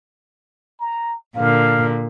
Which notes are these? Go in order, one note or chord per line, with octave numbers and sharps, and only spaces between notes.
A#5
A#2 D3 A#3 F5